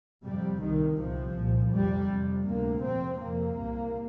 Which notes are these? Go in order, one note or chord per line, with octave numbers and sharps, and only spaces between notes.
F2 C3 G3
C2 C3 D#3
C2 C3 F3
C2 A#2
F2 C3 G3
F2 C3
D2 C3 A#3
F2 C3 C4
F2 C3 A#3
C2 C3